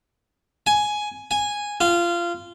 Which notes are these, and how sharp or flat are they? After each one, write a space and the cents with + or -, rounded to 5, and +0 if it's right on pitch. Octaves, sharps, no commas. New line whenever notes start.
G#5 +10
G#5 -5
F4 -20